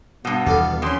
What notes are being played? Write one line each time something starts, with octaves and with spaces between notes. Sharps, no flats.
G2 B2 B3
D#2 E3 G4 A4 F5
F2 C#4 C6